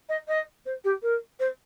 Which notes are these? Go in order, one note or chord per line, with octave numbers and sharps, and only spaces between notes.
D#5
D#5
C5
G4
A#4
C5